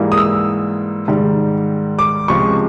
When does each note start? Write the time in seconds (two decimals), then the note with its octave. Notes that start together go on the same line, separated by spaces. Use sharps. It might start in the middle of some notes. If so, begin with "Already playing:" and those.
Already playing: G#2 E3 G3 A#3
0.12 D#6
0.18 E6
1.08 G#2 D#3 G3
1.99 D6
2.28 C#2 C3 F3 G#3 C#6